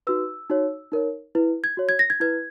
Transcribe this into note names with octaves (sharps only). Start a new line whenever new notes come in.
D#4 F#4 B4 E6
D#4 F#4 C#5
D#4 A#4 C#5
E4 B4
G#6
F#4 C#5
G#6
A#6
G#6
E4 B4 G#6